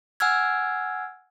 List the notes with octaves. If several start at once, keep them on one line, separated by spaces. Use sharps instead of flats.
F#5 G#5 E6 F6 G#6